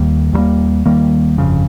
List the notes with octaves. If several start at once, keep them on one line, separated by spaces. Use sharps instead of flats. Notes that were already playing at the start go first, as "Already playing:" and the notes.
Already playing: D#2 D#3 G3 A#3
D#2 D#3 G3 A#3
D#2 D#3 G3 A#3
G1 F2 C#3